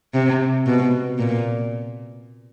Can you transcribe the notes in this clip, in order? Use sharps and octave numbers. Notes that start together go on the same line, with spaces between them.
C3
B2
A#2